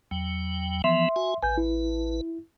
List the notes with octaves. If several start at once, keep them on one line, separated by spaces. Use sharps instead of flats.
E2 F#3 G5
E3 F3 B3 E5 C6
F#4 G#5
A1 B4 G#5 G6
E4